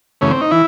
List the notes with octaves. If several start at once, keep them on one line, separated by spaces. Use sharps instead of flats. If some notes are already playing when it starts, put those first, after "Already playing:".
F#2 C#3 E3 A3 C#4
C4
D#4
E3 E4